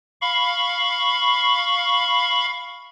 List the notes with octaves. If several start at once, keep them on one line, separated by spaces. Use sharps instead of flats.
F5 B5 C#6